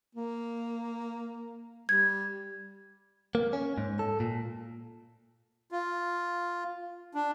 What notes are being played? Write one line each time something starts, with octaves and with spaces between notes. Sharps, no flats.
A#3
G3 G#6
A#3
C#4
G#2
A4
A#2
F4
D4